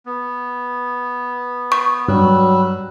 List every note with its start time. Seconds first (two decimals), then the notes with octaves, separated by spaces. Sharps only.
0.06 B3
1.72 C#6
2.08 G2 F#3 G3 E6 F#6